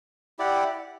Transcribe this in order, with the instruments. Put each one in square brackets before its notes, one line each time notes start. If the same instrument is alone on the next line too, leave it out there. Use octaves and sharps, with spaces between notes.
[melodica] E4 G4 D5 F#5